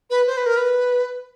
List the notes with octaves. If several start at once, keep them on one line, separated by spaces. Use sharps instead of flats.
B4
C5
B4
A#4
B4